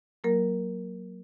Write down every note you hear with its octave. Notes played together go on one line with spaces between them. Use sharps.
F#3 A#3 A#4